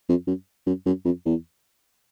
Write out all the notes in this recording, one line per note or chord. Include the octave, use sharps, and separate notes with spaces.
F2
F#2
F#2
F#2
F2
E2